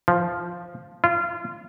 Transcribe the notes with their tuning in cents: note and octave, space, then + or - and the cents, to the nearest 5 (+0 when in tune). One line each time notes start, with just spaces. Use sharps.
F3 +0
F4 -25